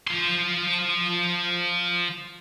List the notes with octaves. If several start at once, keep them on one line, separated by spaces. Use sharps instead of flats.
F3 C6